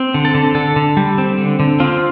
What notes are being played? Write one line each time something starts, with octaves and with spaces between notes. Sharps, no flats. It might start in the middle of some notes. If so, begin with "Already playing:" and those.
Already playing: C4
D3
A4
D3
D3 A4
D3
G3
C4
D3
D3
C4 F4